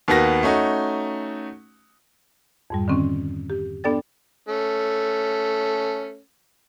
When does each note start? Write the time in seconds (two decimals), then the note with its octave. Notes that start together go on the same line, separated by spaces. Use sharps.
0.08 D#2 A#3 B3 F#4 A#6
0.43 A3 C#4 D#4 F#4
2.70 F2 G#2 G3
2.88 D3 D#3 C4 C#4
3.50 G4
3.84 B3 D4 A4 D5 G5 A6
4.49 A3 C#4